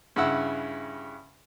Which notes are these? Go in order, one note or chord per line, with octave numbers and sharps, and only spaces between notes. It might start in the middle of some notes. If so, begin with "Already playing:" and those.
G2 C#3 E4 F#5 E6